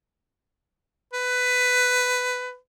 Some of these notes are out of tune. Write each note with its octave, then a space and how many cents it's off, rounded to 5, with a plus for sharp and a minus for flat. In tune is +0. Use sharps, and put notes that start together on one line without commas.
B4 +15